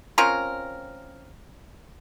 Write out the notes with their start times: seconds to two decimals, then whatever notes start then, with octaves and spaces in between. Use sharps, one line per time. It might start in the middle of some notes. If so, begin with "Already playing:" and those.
0.18 C4 C#4 F4 A#4